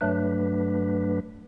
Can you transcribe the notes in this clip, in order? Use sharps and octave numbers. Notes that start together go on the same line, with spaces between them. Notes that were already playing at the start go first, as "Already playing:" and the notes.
G2 F#3 A3 D4 B4